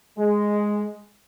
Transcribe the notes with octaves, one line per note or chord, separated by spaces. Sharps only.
G#3